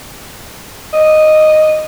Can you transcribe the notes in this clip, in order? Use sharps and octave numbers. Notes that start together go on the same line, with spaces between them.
D#5